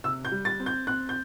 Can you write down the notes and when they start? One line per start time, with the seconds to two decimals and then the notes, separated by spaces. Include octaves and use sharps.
0.04 C3 E6
0.25 G6
0.32 G3
0.45 A6
0.60 C4
0.66 G6
0.87 C4 F#6
1.09 G6